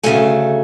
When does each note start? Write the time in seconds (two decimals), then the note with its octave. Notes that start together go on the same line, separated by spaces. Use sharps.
0.03 D2 C#3 F#3 A3 G#5